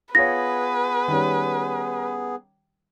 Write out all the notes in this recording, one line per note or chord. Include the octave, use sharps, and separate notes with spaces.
B3 F4 G#4 B4 C#5 A#6
D#3 G3 C#4